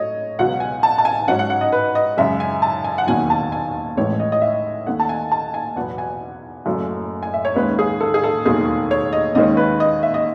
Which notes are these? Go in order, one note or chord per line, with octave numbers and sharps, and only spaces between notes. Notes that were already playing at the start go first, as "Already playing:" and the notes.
Already playing: F#3 A3 C#5 D#5
C#2 B2 F#3 F#5
G#5
A5
A5
G#5
G#2 F#3 C#4 F#5
F#5
F#5
D#5
B4
D#5
F#2 C#3 G#3 E5
G#5
A5
G#5
F#5
E1 D#2 D#3 F#3 G#5
A5
G#5
A1 A2 E3 G#3 C#5
D#5
D#5
E5
D#2 D#3 A3 F#5
A5
G#5
A5
G#5
E2 B2 F#3 B3 F#5
G#5
F#1 F#2 C#3 F#3 A3
G#5
E5
C#5
D#2 D#3 G#3 C#4 B4
G#4
A4
G#4
A4
E1 D#2 D#3 F#3 A3 G#4
C#5
D#5
D#2 D#3 G#3 C#4 D#5
B4
D#5
E5
D#5